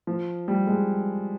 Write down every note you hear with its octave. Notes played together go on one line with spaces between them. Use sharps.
F3
G3
G#3